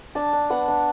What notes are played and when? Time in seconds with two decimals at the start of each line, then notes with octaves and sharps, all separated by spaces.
0.15 D4 A5
0.33 D4
0.50 B3 F#5
0.68 D4